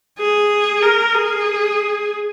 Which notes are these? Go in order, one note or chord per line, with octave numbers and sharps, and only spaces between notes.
G#4
A#4
G#4